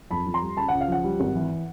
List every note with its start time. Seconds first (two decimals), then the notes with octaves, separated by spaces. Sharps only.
0.11 F2 A5 B5
0.26 F2
0.34 A#5 C6
0.42 G3
0.57 C#2 A5 B5
0.68 C#2 F#5
0.81 F5
0.88 F3 F#5
1.04 G3
1.20 G#1
1.35 E3